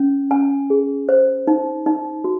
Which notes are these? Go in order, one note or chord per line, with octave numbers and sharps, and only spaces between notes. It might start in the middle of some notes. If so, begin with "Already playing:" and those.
Already playing: C#4
C#4 G#5
G#4
C5
D#4
D#4
F#4